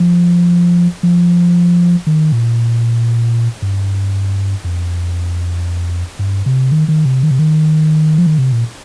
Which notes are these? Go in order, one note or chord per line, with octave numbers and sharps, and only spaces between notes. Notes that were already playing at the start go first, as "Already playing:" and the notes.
Already playing: F3
F3
D#3
A#2
G2
F2
G2
C3
D#3
D#3
C3
D#3
C3
D#3
F3
D#3
C3
A#2